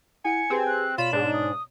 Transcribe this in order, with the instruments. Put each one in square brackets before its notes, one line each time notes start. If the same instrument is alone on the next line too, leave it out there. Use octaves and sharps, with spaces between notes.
[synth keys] E4 F#5 [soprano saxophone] G#5 [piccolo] C#7
[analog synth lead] C4 [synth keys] G4 G#4 B4
[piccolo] F#6
[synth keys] B2 C#5 D5 [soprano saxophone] F4 [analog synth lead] B5 [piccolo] E7
[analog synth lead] G#2 [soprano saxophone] D4
[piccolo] D#6